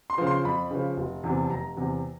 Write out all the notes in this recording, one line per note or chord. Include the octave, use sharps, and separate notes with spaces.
C6
C#3 F3
C6
F2 B5
C#3 F3
F1
E2 C3
A5
F1 A#5
E2 C3